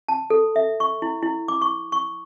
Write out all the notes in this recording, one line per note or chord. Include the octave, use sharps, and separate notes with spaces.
A5
A4
E5
C#6
E4
E4
D6
C#6
C#6